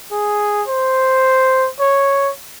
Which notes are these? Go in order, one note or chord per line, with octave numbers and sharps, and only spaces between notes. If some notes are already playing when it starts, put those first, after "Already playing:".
G#4
C5
C#5